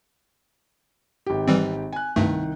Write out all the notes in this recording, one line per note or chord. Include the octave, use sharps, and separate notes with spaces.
G#1 G4
E3 G3 C4
G#5 F#6
C2 G2 D#3 A3